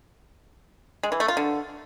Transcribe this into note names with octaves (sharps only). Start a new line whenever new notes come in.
G#3
E3
A3
F4
D3